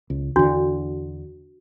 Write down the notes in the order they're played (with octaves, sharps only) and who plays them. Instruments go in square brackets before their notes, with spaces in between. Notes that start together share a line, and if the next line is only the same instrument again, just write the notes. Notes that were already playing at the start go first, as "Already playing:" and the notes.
[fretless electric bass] C#2
[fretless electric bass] E2 D3 [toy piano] D4 F#4